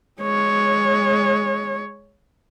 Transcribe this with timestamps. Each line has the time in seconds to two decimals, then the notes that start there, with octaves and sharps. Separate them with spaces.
0.21 G#3 C#5